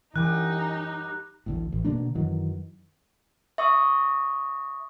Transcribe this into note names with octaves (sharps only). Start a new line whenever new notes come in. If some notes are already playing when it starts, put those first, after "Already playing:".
F#2 E3 G3 D#4 G#5 F#6
A1 D2 A2
A1
B2 D3 A#3 D4
F#2 D#3 E3 F#3
E5 C#6 D#6